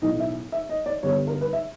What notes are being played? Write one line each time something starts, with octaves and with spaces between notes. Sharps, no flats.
B1 A2 E3 D#5
E5
E5
D#5
D5
G2 D3 G3 B3 C#5
A#4
B4
E5